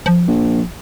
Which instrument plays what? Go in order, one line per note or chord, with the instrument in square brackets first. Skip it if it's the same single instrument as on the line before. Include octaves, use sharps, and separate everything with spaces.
[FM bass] F3
[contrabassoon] A#1